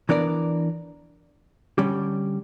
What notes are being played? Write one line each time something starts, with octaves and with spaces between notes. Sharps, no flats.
E3 B3 D4 A#4 D5
D3 G3 C#4 G4